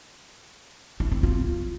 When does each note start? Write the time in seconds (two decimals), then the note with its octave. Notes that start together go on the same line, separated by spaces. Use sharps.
1.00 E4
1.12 C4
1.23 F4